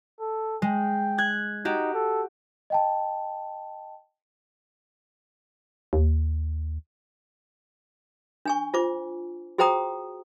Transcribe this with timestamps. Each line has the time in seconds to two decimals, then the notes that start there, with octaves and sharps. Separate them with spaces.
0.20 A4
0.62 G#3 G5
1.18 F#6 G#6
1.65 D#4 F#4 G4
1.94 A4
2.70 D#5 G5 A5
5.93 D#2
8.45 D4 G#5 C#6
8.74 F4 C5 D6
9.58 F#4 G#4 C5 G5 A#5 D#6